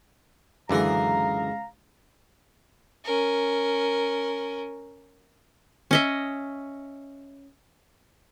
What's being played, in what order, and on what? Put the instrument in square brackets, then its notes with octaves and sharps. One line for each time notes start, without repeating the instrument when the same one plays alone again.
[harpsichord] C#2 G#4 A#4 [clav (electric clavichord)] F#2 D3 E3 [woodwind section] F5 A#5
[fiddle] C#4 A#4
[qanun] C#4 D#5 E5